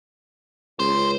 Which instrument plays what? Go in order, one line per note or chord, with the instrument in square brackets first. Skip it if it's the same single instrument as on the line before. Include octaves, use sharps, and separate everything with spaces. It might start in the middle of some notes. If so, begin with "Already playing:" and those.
[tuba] C#2 [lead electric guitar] C5